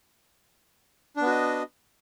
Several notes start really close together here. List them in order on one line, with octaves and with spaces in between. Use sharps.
D4 B3 F#4 D#5